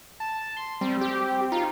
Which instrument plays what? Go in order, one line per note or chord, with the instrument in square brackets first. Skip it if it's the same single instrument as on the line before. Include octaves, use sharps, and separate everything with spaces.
[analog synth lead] A5
C6
[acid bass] G3 [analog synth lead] C4
[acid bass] G4
[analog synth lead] D#4 [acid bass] F4